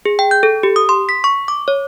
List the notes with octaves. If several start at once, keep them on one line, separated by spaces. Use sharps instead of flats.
G#4
G5
G6
A4
G4
D#6
C6
B6
C#6
D6
C#5